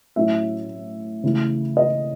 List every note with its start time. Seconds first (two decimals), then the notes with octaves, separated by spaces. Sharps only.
0.16 A2 F#3 C#4 E4 E5
1.23 C#3 E3 A3 E4
1.77 D#5